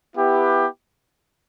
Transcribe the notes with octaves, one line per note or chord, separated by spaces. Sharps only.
B3 E4 G4 B4